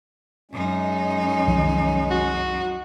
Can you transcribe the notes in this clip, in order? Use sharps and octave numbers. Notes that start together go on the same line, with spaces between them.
F#2 G#3 C#4 D#4
C2 D#3 F3
F#4